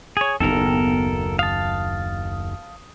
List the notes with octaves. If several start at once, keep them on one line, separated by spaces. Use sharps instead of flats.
G#4 C#5
F#1 D#2 B3 A4 A#4
F5 A5 D#6